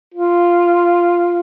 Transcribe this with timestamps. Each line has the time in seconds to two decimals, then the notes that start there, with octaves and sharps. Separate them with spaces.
0.14 F4